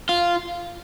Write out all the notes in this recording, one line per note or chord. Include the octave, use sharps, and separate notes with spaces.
F4